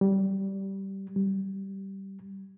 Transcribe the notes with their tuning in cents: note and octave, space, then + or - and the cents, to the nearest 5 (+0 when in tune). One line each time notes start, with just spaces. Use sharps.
G3 -15
G3 -15